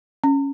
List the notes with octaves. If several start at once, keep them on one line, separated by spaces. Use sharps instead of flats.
C#4